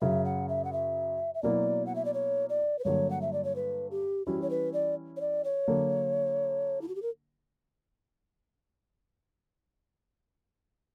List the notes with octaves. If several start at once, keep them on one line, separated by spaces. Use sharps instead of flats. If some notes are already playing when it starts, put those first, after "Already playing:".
F#2 C#3 F#3 E5
F#5
E5
F#5
E5
E5
B2 F#3 A#3 E4 D5
F#5
E5
D5
C#5
D5
B4
G2 D3 F#3 A#3 C#5
F#5
E5
D5
C#5
B4
G4
E3 G3 C#4 E4 F#4
C#5
B4
D5
C#5
D5
C#5
D3 F#3 A#3
E4
F#4
G4
A#4